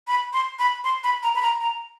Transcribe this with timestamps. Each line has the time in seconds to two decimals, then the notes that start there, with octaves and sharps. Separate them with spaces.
0.08 B5
0.33 C6
0.59 B5
0.84 C6
1.04 B5
1.23 A#5
1.36 B5
1.42 A#5
1.61 A#5